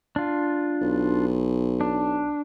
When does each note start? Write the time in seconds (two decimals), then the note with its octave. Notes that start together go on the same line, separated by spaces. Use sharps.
0.16 D4 F4
0.82 B1
1.81 D4